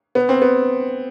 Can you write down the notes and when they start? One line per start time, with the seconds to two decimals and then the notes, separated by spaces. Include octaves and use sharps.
0.15 B3
0.29 C4
0.42 B3